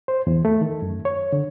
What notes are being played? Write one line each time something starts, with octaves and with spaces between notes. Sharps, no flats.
C5
E2
A3
D#3
F#2
C#5
D3